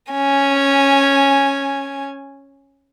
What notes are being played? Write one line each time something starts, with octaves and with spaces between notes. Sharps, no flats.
C#4 G#5